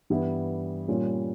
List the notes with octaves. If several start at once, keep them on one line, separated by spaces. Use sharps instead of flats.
G2 E3 G3 B3 E4
A#2 G3 C#4